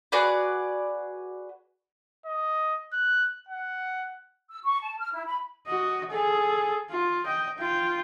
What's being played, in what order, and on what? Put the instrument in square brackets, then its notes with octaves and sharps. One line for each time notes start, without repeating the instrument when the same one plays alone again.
[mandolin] F#4 G#4 B4 D5
[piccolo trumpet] D#5
F#6
F#5
[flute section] E6
C#6
A5
F6
E4
B5
[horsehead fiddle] F#4 D#5
G#4 A4
F4
D#5 G5
F4 G5